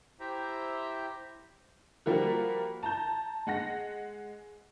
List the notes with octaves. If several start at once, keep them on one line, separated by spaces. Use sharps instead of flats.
E4 G4 C5 E5 G5 A#5
F3 G3 A#3 F#4
A5 A#5 G6
G#3 F#5 A#6